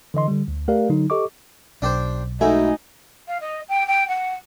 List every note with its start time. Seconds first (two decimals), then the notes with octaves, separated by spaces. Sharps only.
0.14 D3 E3 D#5 C6
0.28 D3 G3
0.48 D2
0.68 A3 G4 A#4 D5 F5
0.90 D3 F#3 D#4
1.10 G4 A4 D#5 C#6 D6
1.82 B1 D4 G4 C5
2.41 G#2 A3 D#4 E4 F#4 G#5
3.27 F5
3.40 D#5
3.69 G5
3.87 G5
4.08 F#5